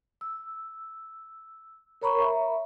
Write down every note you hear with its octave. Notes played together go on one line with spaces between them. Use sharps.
E6
A#4 C#5 A#5 B5 C#6
E5